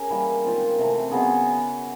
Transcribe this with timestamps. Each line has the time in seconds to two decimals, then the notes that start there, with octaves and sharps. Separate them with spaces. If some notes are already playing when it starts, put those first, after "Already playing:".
Already playing: C#4 G#4 A#4
0.10 E3 G3 A#3
0.45 D#3 G#3 C4 F4
0.79 C3 E3 A3
1.12 C#3 F#3 B3 F#4 G#4